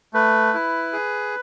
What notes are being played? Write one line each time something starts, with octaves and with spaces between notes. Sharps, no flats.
A3 B4
E4
G#4